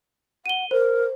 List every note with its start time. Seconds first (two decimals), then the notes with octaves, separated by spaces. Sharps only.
0.46 F#5 D#7 G7
0.71 A#4 C5